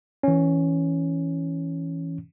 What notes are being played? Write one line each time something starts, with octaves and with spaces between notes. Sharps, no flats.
E3 C#4